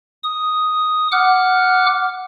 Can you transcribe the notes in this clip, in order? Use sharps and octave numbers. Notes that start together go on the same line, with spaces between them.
D#6
F#5 D6 F6 F#6